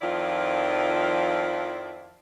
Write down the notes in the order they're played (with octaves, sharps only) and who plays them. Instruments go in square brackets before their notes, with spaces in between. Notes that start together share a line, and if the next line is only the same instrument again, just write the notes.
[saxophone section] F2 D#3 F3 E4 F4 D5